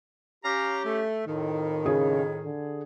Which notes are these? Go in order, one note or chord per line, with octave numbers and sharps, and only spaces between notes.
C#4 G4 F5 A#5
A3
F2 A2 D#3
C#3 G#4
D3